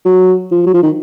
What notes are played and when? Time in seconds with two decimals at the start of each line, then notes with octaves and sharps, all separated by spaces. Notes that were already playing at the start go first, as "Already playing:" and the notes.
0.05 F#3
0.51 F3
0.67 F#3
0.74 F3
0.83 D#3